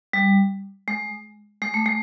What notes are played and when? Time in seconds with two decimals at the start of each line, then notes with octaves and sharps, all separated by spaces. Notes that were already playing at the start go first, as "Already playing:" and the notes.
0.13 G3
0.88 G#3
1.62 G#3
1.74 A3
1.86 G#3